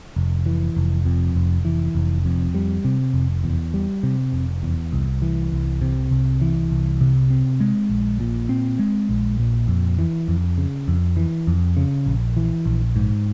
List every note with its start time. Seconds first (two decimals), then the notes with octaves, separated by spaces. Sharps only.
0.16 F1
0.46 E3
0.77 F1
1.05 F2
1.35 F1
1.65 E3
1.95 F1
2.25 F2
2.55 G3
2.85 C3
3.14 F1
3.44 E2
3.74 G3
4.03 C3
4.33 F1
4.63 E2
4.93 C2
5.22 E3
5.52 C2
5.81 C3
6.11 C2
6.41 E3
6.71 C2
7.01 C3
7.30 C4
7.60 G#3
7.90 A#1
8.20 A#2
8.49 C4
8.79 G#3
9.09 A#1
9.39 A#2
9.68 F2
9.99 E3
10.28 F2
10.58 C#3
10.88 F2
11.17 E3
11.47 F2
11.77 C#3
12.06 A#1
12.37 E3
12.66 A#1
12.96 G#2